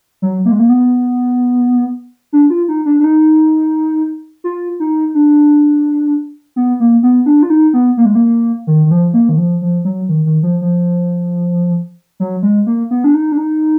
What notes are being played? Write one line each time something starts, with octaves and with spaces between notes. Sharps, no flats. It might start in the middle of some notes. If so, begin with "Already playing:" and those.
F#3
A#3
G#3
A#3
B3
D4
F4
D#4
D4
D4
D#4
F4
D#4
D4
B3
A#3
B3
D4
F4
D#4
B3
A#3
G#3
A#3
D#3
D#3
F3
A#3
D#3
F3
F3
F#3
D#3
D#3
F3
F3
F#3
G#3
A#3
B3
D4
D#4
D4
D#4